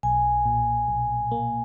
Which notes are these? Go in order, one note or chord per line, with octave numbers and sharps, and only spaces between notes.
B1 G#5
A#2
B1
A#3